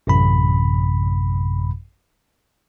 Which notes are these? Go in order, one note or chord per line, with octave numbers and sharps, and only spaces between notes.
A1 F#2 C3 B5